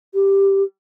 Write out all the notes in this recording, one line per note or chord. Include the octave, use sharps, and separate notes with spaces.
G4